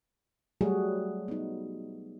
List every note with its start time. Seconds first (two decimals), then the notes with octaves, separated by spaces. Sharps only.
0.61 F#3 G3 A3 F#4 G#4
1.28 B3 D#4